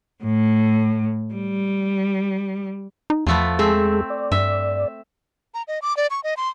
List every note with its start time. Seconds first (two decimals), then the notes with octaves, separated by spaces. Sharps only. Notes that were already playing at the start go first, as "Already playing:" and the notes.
0.24 A2
1.33 G3
3.10 D#4
3.27 E2 F3 A3 B3
3.59 G#3 C4 G#4 A4 E5
4.10 D5
4.32 G2 E5
5.54 A#5
5.68 D#5
5.82 D6
5.97 D5
6.11 C#6
6.24 D#5
6.37 C6